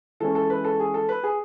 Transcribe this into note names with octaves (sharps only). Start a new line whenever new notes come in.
E3 G#3 C#4 A4
A4
B4
A4
G#4
A4
B4
G#4